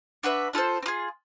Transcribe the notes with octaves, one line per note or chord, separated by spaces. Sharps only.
D4 F#4 B4 E5
D4 F4 A4 C5
C4
F4 G#4